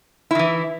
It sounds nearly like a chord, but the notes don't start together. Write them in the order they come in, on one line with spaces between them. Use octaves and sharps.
E4 D#3 E3